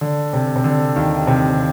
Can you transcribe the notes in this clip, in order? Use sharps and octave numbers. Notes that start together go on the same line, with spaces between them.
D3
C3
C3
D3
D#2 D#3
C3